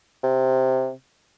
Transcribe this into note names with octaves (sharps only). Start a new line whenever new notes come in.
C3